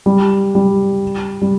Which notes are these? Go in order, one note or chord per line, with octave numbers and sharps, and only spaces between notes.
G3
G3
G3